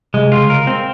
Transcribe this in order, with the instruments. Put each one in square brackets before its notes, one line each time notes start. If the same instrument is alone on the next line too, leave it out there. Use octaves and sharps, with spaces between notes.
[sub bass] C3 [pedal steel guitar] G#3
[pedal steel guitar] F4
[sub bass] C#3
[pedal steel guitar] A#4
C4